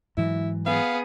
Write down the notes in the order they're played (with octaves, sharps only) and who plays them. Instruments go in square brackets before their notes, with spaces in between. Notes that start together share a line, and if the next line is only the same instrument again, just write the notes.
[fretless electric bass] G#2 E3 F#3 [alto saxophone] E4
[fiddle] B3 G#4 [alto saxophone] F5